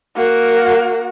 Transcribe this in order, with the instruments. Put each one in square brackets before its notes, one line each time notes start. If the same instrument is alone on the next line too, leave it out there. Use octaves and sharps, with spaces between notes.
[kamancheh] A#3 F#4